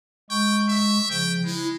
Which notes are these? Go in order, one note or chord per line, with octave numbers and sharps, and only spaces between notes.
G#3 G5 C#6
E5
C#3 F3 G5
G#3 E4